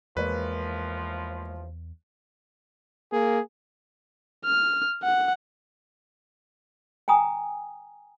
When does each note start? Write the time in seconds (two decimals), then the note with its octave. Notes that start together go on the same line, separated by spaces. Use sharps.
0.17 A1 E2 F3 G#3 A#3 B4 C#5
3.12 A#3 G#4
4.46 F6
5.03 F#5
7.08 G5 G#5 A#5 D#6